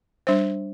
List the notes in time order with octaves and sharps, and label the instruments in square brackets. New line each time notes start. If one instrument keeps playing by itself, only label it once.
[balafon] G3 D4 C5